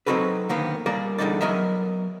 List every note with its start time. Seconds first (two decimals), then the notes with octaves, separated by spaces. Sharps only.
0.06 F#3 C4 D#4 F#4 A4 B4
0.49 D3 D#3 A#3 B3
0.86 G3 A#3 A#4 D5
1.18 E2 D3 G3 D#4 D5
1.41 F#3 B3 A#4 D#5 E5